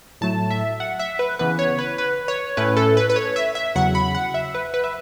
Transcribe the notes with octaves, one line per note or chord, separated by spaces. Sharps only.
A2 F#3 A3 A5
E5
F#5
E5
B4
C#3 E3 B3 B4
C#5
B4
B4
C#5
A2 A3 C#4 E4 B4
A4
B4
B4
C#5
E5
E5
E2 C#3 F#3 F#5
B5
F#5
E5
B4
B4
E5